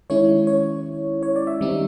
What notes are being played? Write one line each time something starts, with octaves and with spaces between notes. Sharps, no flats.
D#3 G#3 C#4 E4 C#5
C#5
C#5
D5
E5
D#3 G3 C4 D#4